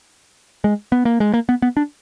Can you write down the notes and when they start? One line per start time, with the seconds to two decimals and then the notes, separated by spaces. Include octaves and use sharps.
0.64 G#3
0.92 B3
1.05 A#3
1.20 G#3
1.34 A#3
1.49 B3
1.62 B3
1.77 D4